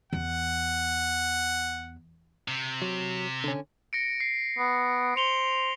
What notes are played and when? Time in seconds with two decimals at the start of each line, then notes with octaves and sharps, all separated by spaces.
0.13 E2 F#5
2.48 C3
2.82 F#3
3.44 D3 C#4
3.93 A#6 C#7 D7
4.20 C7
4.58 B3
5.16 C5 C#7 F7 G7